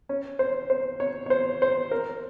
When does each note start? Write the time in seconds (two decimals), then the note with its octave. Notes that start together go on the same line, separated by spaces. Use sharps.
0.09 C#4
0.39 C5
0.70 C5
1.00 C#5
1.26 C#5
1.30 C5
1.62 C5
1.91 A#4